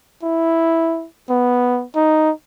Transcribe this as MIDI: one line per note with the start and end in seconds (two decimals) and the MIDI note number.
0.23 1.07 64
1.30 1.85 59
1.96 2.32 63